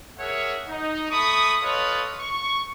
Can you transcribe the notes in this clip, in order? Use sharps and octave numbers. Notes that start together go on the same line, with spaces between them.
G#4 A#4 C#5 E5 F#5
D#4
A3 B5 C#6 D#6
F4 A4 B4 C#5 D#5
C#6